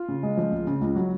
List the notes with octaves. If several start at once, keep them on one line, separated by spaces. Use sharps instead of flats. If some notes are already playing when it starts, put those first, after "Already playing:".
Already playing: F4
C#3
G#3
F3
C#2
C#3
C#2
F#3